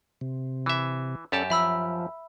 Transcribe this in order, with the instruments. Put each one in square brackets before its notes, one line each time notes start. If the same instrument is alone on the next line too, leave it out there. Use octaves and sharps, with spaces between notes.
[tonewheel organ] C3
[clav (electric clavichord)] E3 E5
[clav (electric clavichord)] F#2 G4 A5 [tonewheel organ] C#4 A4 D5
[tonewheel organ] F3 [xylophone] E5 B5 E6